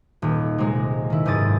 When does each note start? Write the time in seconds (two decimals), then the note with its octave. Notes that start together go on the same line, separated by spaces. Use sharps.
0.22 D#1
0.58 C3 G#3
1.10 D#3 E4
1.25 F#1 G#2 C4 G#4 D#6 A6